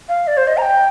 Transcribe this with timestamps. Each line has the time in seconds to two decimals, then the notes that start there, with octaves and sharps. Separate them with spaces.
0.09 F5
0.27 D5
0.37 C5
0.47 D#5
0.57 A#5
0.62 G5